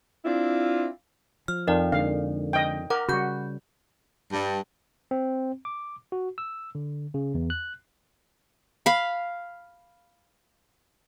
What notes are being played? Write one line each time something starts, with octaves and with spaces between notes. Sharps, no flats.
C4 D4 E4 F4
F3 F6
F2 D#4 A#4 D5
D3 G#3 F5
D#5 G5
A#4 F#5 D6
C#3 G3 F#4 B5 G6
G2
C4
D6
F#4
E6
D3
C#3
E2
F#6
F5 B5